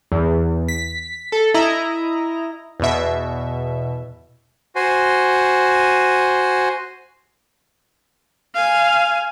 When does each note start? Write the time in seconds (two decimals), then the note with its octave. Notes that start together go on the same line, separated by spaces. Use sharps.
0.12 E2
0.68 B6
1.32 A4
1.54 E4 D#5 A#5
2.80 E2 B2 E5
4.76 F#4 C5 G#5
8.54 F5 G#5